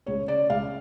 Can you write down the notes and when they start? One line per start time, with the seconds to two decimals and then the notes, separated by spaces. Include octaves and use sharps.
0.06 C#2 C#5
0.28 C#3 D5
0.50 C#2 F5